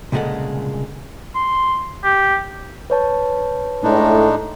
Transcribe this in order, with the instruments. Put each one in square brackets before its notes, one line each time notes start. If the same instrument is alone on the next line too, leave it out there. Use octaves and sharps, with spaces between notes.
[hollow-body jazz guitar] C2 A#2 C#3 G#3 A4 F#5
[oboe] C6
G4
[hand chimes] B4 C#5 A5
[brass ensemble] A2 [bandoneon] G#3 D4 D#4